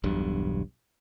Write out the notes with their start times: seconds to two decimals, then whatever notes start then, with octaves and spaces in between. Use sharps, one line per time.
0.04 E1 B1 G2